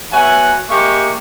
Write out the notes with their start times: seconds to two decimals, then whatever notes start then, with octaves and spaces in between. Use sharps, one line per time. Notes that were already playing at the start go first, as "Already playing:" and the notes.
0.12 B3 F#4 C#5 E5 F#5 G#5
0.69 G#3 A#3 G4 E5 C#6